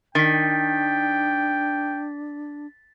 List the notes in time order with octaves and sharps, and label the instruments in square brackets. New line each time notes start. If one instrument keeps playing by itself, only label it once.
[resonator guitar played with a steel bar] D#3 [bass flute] D4 [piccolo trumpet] G5 [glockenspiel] A6 B6